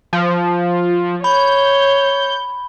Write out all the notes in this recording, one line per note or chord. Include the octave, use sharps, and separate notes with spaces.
F3
C#5 B5 G6